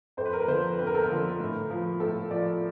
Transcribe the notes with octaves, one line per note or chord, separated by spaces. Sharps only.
F2 C5
B4
A#4
B4
D3 F3 C5
F2 B4
A#4
A4
A#4
D3 F3
A2
F3
A2 A4
F3 D5